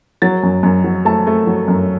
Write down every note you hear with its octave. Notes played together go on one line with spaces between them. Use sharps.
F#3 A6
F#2
F#2
F#3
A3 A5
A3
F#3
F#2